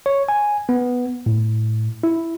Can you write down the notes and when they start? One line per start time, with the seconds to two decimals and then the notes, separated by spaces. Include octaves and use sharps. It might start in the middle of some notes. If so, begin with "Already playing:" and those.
0.06 C#5
0.29 G#5
0.69 B3
1.26 A2
2.03 E4